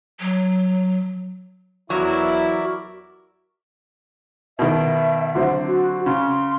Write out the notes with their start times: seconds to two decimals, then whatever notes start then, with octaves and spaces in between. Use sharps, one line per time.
0.20 F#3
1.90 E2 F#3 E4 F#4 A#4 D5 E5
4.59 B2 D#3 E5
5.35 D3 F#3 C4
5.68 F#4
6.06 C#3 C6